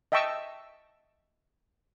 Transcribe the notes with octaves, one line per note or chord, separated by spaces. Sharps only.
D#5 E5 G5 A5 C#6 E6